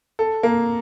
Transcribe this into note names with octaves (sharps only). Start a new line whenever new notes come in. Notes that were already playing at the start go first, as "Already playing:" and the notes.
A4
A#3